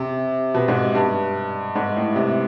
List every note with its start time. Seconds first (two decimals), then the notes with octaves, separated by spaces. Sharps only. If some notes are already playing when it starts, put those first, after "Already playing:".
Already playing: C3
0.54 B2
0.68 G#2
0.95 G2
1.75 G#2
1.96 A2
2.15 C3